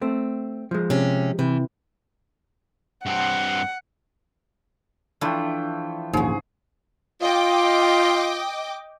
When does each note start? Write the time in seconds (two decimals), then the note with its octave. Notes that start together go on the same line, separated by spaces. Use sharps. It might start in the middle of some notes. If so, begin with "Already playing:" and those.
0.02 A3 C4
0.71 F3 G#3
0.90 C3 C#4
1.39 C3 E3
3.06 G2 C4 F#5
5.21 E3 F3 A3 D4 G5
6.13 A#1 D#2 G#2 C#3 G#4
7.21 F4 D#5 G5 D6